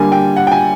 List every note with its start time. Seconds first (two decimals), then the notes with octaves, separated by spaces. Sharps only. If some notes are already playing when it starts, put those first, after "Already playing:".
Already playing: D3 G3 A#3 G#5
0.12 G5
0.36 F#5
0.47 G5
0.52 G#5